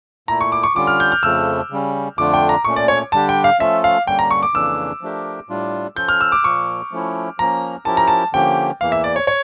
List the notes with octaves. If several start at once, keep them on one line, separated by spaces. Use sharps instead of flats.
A#2 A3 E4 A#5
C#6
D6
C#6
D3 G3 C#4 F4 D6
F6
G6
F6
F2 C#3 F3 A3 E6
C#3 G3 C#4
F2 D3 A3 D4 F4 D6
G5
A#5
A#2 A3 C#4 C#6
D5
C#5
D3 G3 D4 G4 A5
G5
F5
F3 A3 C#4 F4 A4 E5
F5
G2 D3 G3 A#3 C#4 G5
A#5
C#6
D6
F2 C#3 E3 A#3 D4 E6
F3 A3 D4 G4 A#4
A2 G3 D4 F4
F3 C#4 F4 A4 G6
F6
E6
D6
A#2 F3 A#3 C#6
F3 A3 C#4 E4
F3 A#3 C#4 A#5
F3 C#4 E4 G4 A#4 A5
A#5
A5
D3 F3 A#3 C#4 G4 G5
E2 E3 A#3 F5
E5
D5
C#5
C#5